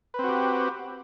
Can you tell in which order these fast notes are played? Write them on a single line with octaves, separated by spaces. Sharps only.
B4 C4 F#4 G4